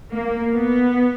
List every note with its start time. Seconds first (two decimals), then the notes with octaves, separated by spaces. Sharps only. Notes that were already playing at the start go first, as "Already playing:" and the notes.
0.15 A#3
0.51 B3